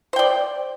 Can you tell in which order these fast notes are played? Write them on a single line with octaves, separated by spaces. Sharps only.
C5 G5 D5